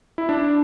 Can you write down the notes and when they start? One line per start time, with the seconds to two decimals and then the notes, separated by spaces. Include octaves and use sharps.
0.18 E4
0.29 D4